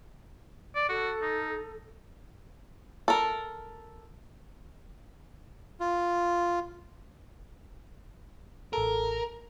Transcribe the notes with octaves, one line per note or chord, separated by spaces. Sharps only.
D5
F#4 A4
D#4
A4 A#4
F4
A1 A4 A#4